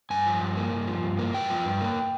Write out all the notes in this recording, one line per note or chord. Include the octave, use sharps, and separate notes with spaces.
G2 G#5
F3
G2
A#3
G2
F3
G2
A#3
G2 G5
F3
G2
A#3